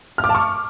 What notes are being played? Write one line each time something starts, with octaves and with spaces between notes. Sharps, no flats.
F6
D6
A5
C#6